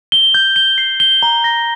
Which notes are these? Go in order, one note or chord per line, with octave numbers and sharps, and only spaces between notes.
G7
G6
G7
C7
G7
A#5
A#6